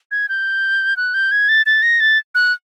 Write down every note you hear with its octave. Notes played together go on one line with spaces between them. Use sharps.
G#6
G6
F#6
G6
G#6
A6
A6
A#6
A6
F#6